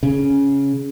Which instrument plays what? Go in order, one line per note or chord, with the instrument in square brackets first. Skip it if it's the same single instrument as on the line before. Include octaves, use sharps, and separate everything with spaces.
[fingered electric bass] C#3